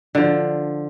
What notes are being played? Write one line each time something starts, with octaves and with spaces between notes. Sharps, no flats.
D3 F3